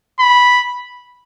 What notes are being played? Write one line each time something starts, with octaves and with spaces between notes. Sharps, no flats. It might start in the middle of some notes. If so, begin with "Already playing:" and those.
B5